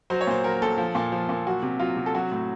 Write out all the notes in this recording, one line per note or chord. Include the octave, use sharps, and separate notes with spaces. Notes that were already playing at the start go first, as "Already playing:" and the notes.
F#3 C5
C#5
A#2 C5
F#3 A#4
A#2 A4
F3
A#2
F3
A#2
F#3 F#4
C3
F#3 F4
C3
A4
F#3 F#4
A2